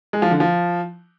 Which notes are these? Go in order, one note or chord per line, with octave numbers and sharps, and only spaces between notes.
G#3
F3
D3
F3